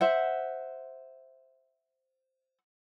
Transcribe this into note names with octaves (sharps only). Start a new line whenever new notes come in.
C5 E5 F#5